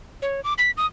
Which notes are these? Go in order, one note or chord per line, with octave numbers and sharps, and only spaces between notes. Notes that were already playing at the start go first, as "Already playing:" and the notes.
C#5
D6
B6
D#6